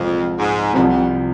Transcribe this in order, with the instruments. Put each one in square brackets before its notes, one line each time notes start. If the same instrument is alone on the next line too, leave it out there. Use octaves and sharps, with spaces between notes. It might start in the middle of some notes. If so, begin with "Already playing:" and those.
Already playing: [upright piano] C2 A#2 F3 G#3 [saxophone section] F2
[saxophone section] G#2
[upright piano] C2 C3 F3 [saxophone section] F2
[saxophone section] F2